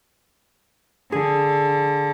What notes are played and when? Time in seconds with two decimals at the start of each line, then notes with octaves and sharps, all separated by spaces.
1.12 D3 G#4